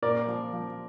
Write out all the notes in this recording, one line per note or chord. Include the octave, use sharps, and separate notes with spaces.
A#2 A#4 D5
F3
F3